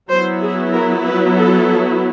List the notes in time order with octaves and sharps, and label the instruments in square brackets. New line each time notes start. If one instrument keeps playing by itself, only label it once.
[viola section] F#3 B3 E4 C5
G#4
A#4
B4
A4